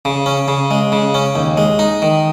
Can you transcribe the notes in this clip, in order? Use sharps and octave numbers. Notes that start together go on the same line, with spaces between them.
C#3
C#4
C#3
G#3
C#3
C#4
D#2
G#3
D#4
D#3